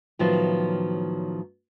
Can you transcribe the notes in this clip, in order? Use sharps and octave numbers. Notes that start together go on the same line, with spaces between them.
A2 D#3 F3 F#3 B3 F4